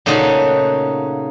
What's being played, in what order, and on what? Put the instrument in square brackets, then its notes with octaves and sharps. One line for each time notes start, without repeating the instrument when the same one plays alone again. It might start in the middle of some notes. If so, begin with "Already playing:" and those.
[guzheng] A#2 C#3 A3 D#4 F#4